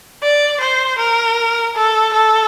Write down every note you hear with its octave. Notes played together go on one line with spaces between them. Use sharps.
D5
C5
A#4
A4
A4